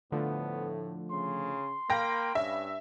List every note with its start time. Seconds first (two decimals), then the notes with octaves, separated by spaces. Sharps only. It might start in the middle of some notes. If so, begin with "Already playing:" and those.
0.12 A2 D3 F3 A3 B3
1.11 C#3 C6
1.90 A#3 F5 G5 B5 A#6
2.35 G2 C#4 E5